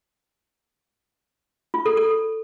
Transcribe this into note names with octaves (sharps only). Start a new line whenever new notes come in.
F4
A4
A4